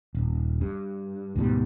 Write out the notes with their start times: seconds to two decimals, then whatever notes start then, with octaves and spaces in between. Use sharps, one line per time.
0.15 D#1
0.61 G2
1.35 D2 G#2 B2 G3